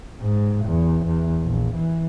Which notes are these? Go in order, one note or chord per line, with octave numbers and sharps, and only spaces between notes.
G#2
E2
E2
A#1
E3